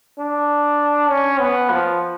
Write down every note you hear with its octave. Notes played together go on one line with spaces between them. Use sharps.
D4
C#4
B3
F3